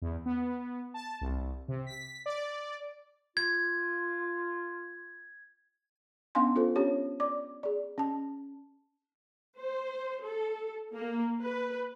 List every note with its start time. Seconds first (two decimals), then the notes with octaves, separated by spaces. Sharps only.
0.02 E2
0.26 B3
0.94 A5
1.21 C2
1.68 C3
1.87 B6
2.26 D5
3.37 F4 G#6
6.35 B3 C#4 D4 F5 G#5 C6
6.56 F4 A4 C5
6.76 C#4 D4 G4 C#5
7.20 D5 D6
7.63 G#4 D5
7.98 C#4 A5
9.59 C5
10.24 A4
10.95 A#3
11.43 B4